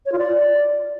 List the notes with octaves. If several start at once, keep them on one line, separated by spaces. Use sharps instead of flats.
C#5
F4
D5